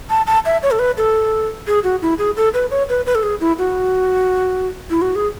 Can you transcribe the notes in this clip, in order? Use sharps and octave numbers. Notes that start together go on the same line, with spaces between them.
A5
A5
E5
C#5
A4
B4
A4
G#4
F#4
E4
G#4
A4
B4
C#5
B4
B4
A4
G#4
E4
F#4
E4
F#4
G#4